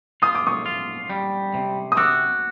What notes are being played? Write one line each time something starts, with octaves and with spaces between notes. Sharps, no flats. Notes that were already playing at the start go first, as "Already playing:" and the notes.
F4 D#6
D6
C#6 D#6
F4
G3
C3
D#6
F#4 D6 E6